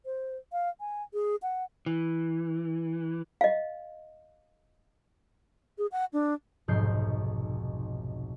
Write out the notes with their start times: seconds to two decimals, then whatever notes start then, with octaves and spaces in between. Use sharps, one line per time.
0.05 C5
0.52 F5
0.80 G#5
1.13 G#4
1.42 F#5
1.86 E3
3.41 D#5 F5
5.78 G#4
5.92 F#5
6.13 D4
6.68 F1 B1 G#2 B3 G6 C7